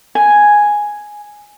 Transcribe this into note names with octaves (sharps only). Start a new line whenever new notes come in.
G#5